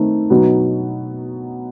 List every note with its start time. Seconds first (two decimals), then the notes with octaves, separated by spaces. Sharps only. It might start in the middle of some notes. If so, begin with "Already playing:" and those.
Already playing: D#3 A3 C4
0.30 B2 F#3 B3 D#4 F#4